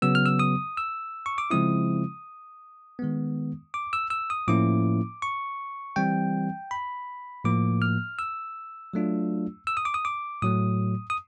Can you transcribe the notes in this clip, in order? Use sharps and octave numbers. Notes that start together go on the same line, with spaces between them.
C#3 F#3 B3 E6
F6
E6
D#6
E6
C#6
D6
C#3 F3 G#3 C4 E4 D#6
D#3 G#3 B3
D6
E6
E6
D#6
A2 F3 A#3 C#4 E4 D6
C#6
E3 G3 C4 G5
B5
A2 F3 A#3 D6
F6
E6
F#3 A3 D4 F4
E6
D#6
D6
D#6
D6
A2 F#3 A3 D#6
D#6